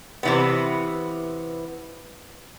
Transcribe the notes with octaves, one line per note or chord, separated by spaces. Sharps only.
C3 E3 B3